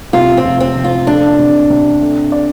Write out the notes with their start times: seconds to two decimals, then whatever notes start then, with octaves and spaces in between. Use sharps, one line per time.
0.13 C3 F4
0.37 C4
0.45 F1
0.60 C4
0.76 F1
0.84 F4
1.07 A3 D4
1.39 C3
1.70 C3
2.01 A3
2.32 D5